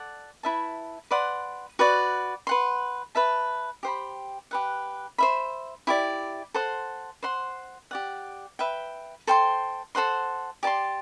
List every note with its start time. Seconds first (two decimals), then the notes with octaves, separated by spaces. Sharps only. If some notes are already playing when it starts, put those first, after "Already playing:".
Already playing: A4 D5 F#5
0.43 E4 B4 E5 A5
1.11 B4 D5 F#5 C6
1.79 F#4 B4 D5
2.47 B4 F#5 C6
3.15 B4 E5 A5
3.83 G4 C5 G5 B5
4.51 G4 B4 F#5
5.18 C5 E5 B5
5.87 E4 G4 D5
6.54 A4 C5 F#5 C6
7.23 C5 F#5 C6
7.91 G4 D5 F#5
8.59 B4 E5 G5
9.27 A4 C5 G5 C6
9.95 A4 C5 F#5 C6
10.63 G4 D5 A5 C6